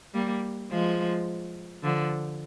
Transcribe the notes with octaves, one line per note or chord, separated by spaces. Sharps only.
G3 A#3
F3 G#3
D3 F3